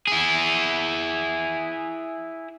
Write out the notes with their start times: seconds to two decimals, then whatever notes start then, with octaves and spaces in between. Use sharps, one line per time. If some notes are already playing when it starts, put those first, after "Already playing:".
0.08 E4 G#4